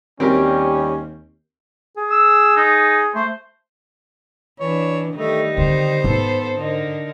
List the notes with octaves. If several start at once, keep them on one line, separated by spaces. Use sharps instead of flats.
D#2 G3 C4 C#4 G4 A#4
G#4
E6
D#4
A3 C5
E3 D4 C#5
D#3 G3 A3 D#4
D3 C4 C5
G#2 B3 A4
D3 D#4 A#4